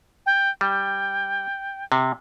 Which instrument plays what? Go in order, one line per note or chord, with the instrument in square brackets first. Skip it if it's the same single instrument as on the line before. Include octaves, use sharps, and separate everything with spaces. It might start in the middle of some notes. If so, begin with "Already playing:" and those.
[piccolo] G5
[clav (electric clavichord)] G3 [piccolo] G5
[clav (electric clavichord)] C3